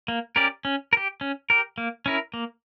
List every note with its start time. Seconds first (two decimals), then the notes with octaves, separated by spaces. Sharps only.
0.08 A#3
0.36 C#4 G4 A#4 D5
0.65 C#4
0.93 A#4
0.97 G4
1.21 C#4
1.50 G4 A#4
1.78 A#3
2.06 C#4 E4 A#4
2.34 A#3